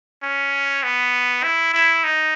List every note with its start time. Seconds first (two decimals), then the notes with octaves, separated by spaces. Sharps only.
0.23 C#4
0.83 B3
1.44 E4
1.74 E4
2.04 D#4